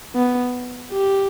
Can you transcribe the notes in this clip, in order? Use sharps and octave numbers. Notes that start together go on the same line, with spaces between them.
B3
G4